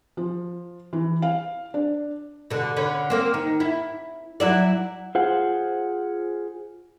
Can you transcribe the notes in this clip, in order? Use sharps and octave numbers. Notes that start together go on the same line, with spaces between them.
F3
E3
F5
D4
B2 D3
D3 C#4 B4
A#3 C4
D#3
E4
F#3 E4 D5
F4 G#4 C5 F#5